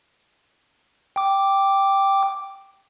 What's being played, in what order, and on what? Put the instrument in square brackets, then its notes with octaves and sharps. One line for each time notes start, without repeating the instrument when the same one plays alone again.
[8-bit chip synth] G5 D6